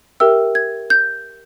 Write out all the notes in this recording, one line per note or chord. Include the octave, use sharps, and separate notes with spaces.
G4 A#4 E5 G5 E6
G#6
G6